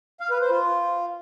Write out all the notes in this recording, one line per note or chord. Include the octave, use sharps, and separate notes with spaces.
F5
B4
C5
F4